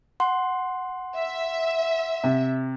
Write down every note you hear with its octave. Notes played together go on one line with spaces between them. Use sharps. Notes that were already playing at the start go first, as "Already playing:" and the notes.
F#5 C6
E5
C3